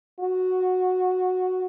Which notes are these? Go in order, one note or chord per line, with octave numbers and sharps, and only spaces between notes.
F#4